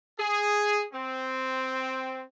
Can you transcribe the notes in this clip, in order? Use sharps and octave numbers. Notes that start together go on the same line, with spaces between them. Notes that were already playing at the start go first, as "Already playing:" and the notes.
G#4
C4